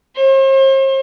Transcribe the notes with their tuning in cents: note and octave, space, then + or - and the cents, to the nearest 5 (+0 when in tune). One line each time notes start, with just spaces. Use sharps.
C5 +45